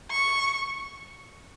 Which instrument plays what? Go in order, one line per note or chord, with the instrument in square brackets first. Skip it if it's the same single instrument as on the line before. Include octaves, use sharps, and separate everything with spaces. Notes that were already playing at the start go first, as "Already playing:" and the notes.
[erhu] C#6